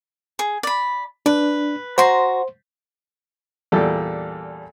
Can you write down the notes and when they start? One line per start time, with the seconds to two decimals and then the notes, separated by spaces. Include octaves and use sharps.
0.39 G#4
0.63 D5 B5
1.26 D4 B4
1.98 F#4 C5 A#5 C6
3.72 E2 A#2 G3 A4